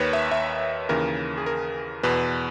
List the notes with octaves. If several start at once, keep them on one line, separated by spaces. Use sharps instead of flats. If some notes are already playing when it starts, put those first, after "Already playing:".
Already playing: D#2 D#3 B4 C#5
E5
E5
D#2 C#3 E3 A#4
G#4
A#4
E2 B2 B4